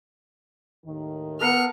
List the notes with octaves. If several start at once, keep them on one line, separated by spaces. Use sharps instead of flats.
D#2 A2 D#3
B3 A4 A#4 F5 F6 C#7